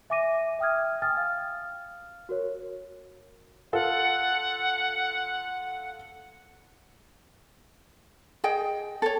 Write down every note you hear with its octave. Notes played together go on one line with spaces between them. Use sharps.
E5 G#5 D6 A#6 D#7
E5 G5 D#6 F6 G#6
G5 G#5 D#6 F6 A6
F5 F6
F#4 A#4 C#5
F4 A4 F#5
G#4 D#5 G5
A4 C#5